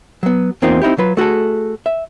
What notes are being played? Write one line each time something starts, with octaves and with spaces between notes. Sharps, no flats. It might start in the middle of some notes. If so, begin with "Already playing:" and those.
F#3 B3
E2 A#3 C4 D#4 F4
C4 D#4 E4 G4
F#3 F4 B4
A3 F#4 G#4 A4
E5